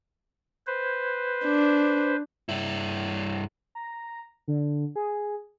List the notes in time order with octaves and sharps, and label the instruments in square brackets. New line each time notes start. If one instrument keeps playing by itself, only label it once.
[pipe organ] B4 C5
[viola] D4
[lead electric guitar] G2 E4
[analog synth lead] A#5
D3
G#4